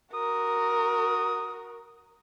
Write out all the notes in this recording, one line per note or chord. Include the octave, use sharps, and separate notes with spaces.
F#4 A#4 D#6